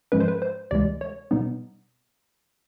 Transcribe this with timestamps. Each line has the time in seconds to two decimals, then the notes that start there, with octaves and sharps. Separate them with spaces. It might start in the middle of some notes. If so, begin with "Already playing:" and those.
0.12 G#2 F3 G#3 C#4 B4
0.20 C5
0.28 B4
0.42 C5
0.71 D2 C3 E3 G#3 D5
1.01 C#5
1.31 B2 G3 B3 D#4